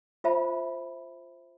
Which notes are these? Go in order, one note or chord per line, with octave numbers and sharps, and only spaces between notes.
F4 C5 E5 A5 B5